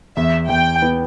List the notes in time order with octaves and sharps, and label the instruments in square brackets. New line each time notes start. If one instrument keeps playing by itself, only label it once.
[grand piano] E2 [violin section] E5
[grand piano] E2 [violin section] G5
[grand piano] B3